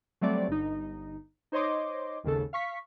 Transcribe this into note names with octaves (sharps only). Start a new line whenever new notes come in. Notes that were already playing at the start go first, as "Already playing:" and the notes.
F#3 G3 A3 C4 D5
G1 D#4
D#4 C5 C#5 D#5 C6 D6
G#1 D#2 C#3 A4
F5 C#6 B6